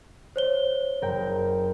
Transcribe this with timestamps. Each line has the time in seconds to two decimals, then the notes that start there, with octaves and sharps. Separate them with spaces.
0.36 C5 C#5 G7
1.02 F#1 A#4 G5